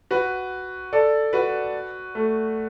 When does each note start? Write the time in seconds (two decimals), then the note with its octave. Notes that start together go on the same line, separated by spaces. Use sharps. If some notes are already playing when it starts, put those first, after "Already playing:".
0.11 F#4 B4
0.93 A4 D5
1.33 F#4 B4
2.15 A3